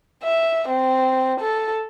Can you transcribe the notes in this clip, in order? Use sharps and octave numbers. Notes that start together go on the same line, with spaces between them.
E5
C4
A4